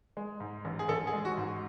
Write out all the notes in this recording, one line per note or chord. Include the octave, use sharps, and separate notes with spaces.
G#3
G#2
A1
G#4
A1 A4
G#4
G#3
F#4
G#2